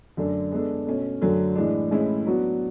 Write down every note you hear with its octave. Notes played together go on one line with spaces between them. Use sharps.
F#2 D3 A3 D4 A4
G#3 B3 D4 A4
B2 A3 C#4
F#2 D3 F#3 A3
A2 E3 G#3 D4
A2 E3 G#3 C#4 E4
F#3 B3 D4 F#4